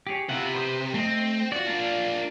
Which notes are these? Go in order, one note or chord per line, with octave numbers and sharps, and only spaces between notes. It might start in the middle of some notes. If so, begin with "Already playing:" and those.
G4 G#4 C#5
C3 E4 F4 F#5
B4 C5 D#6
A3 C4 D#5
F4 F#4 D5
A#3 D4